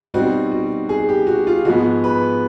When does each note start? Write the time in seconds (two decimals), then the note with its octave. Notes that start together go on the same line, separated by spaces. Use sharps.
0.14 B2 G3 C4 D#4 F#4
0.52 F#4
0.89 G#4
1.09 G4
1.27 F#4
1.47 F4
1.65 G#2 F3 G#3 B3 F#4
2.04 B4